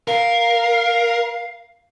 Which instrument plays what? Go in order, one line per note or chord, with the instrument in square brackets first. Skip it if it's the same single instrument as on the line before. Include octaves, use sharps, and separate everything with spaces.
[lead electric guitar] A#4 [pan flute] F5